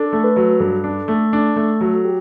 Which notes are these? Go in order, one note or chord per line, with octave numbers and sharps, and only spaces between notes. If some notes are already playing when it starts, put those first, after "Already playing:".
Already playing: D4 A4
A3
B4
F#3
G2 A4
D4
A3
D4
A3
F#3
G4